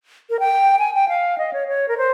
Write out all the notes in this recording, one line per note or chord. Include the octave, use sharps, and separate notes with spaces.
A#4
G5
G#5
G5
F5
D#5
C#5
C#5
A#4
C5